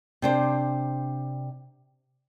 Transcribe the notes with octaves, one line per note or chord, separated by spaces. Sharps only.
C3 D4 C5